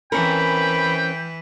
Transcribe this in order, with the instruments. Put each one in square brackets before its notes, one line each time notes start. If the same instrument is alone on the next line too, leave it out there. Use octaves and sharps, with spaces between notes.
[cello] E3 B4 [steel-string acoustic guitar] C4 C#4 A#4 [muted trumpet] G5 [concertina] B5